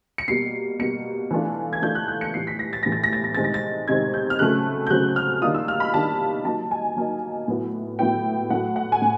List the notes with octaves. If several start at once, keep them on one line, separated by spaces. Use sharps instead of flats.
C#7
B2 G3 A#3 C7
B2 G3 A#3 C#7
E3 A3 D4 F4
G#6
E3 A3 D4 F4 G6
F#6
G6
C#7
A2 E3 G3 C7
B6
A#6
A6
A2 E3 G3 A#6
A6
A#6
A6
A#6
C3 D#3 G#3 C4 A6
A#6
A6
C3 D#3 G#3 C4 G#6
G6
F6
C#3 F#3 A3 C4 F#6
G6
C#3 F#3 A3 C4 F#6
F6
D#3 G3 A#3 D4 F4 D#6
E6
F6
B5
D#3 G3 A#3 D4 F4 A5
F#3 A#3 D#4 A5
G#5
F#3 A#3 D#4
A2 F#3 B3 E4
A2 F#3 B3 E4 G5
A2 F#3 A3 F#5
F#5
G#5
A2